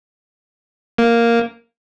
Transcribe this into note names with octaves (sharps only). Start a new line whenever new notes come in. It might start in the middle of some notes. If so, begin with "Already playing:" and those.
A#3